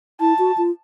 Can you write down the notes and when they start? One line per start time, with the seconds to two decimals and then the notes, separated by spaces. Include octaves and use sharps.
0.20 E4 A5
0.39 F#4
0.57 F4